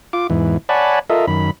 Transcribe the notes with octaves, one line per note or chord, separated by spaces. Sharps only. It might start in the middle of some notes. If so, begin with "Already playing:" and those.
F4 D6
E2 G#2 E3
C#5 D5 F#5 G#5 A5 B5
F4 A4 A#4 D#5 E5
F#2 D#3 B5